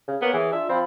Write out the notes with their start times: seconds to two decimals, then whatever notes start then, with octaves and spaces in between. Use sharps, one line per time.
0.08 C#3
0.22 A#3 B3 C#5
0.34 E3 G#4
0.53 D4 F4 E5
0.69 F3 C4 B5